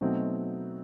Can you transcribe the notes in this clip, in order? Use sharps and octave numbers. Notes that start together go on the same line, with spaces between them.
B2 F#3 A3 C4 D#4